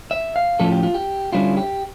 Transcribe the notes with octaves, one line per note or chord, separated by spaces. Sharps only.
E5
F5
A2 F3 C#4 F4 A4
G4
F4
G4
D3 G3 C#4 E4 F4
G4